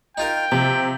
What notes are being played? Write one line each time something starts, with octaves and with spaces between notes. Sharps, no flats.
D#4 F4 A#4 G5
C3 F3